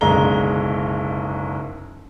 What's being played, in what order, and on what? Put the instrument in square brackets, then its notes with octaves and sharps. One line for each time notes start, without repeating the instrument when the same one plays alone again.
[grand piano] F#1 B1 D3 G#3 A#5 G7